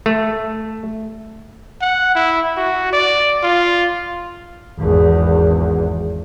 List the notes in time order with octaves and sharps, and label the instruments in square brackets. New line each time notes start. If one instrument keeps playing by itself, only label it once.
[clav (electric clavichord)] A3
[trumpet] F#5
E4
F#4
D5
F4
[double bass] G#1 E2